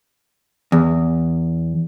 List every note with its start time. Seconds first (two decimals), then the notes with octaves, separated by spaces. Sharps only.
0.72 E2